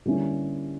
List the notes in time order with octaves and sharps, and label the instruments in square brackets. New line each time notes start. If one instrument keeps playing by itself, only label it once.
[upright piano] D3 G3 A#3 C#4 E4